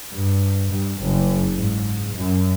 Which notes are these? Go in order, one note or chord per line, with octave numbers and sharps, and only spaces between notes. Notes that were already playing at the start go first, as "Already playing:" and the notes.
G2
G2
F#1
G#2
F#2